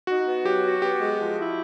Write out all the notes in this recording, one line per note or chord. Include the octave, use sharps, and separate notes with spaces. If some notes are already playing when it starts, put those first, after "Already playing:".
D#4 F#4
B3
F#3 G4
F#4
B3 G4
G#3
F3
E4